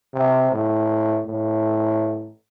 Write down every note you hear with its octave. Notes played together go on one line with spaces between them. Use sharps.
C3
A2
A2